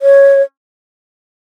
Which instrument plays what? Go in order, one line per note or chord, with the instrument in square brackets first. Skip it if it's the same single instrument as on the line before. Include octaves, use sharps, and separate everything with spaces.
[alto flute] C#5